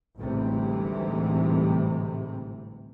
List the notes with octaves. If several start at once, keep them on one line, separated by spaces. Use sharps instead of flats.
A1 D2 G#2 C3 E3 G3